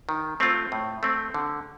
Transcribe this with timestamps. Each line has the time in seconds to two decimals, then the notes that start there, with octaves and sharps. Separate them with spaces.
0.09 D#3
0.40 A3 C4 F4
0.72 A2
1.03 A3 C4
1.34 D3